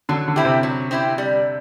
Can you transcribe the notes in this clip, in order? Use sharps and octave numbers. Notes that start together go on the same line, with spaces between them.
D3 F#3
D3
C4 E4 G4
C3
F#3
C4 E4 G4
G3